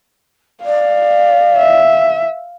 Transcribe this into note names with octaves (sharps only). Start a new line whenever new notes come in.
D5 F5
E5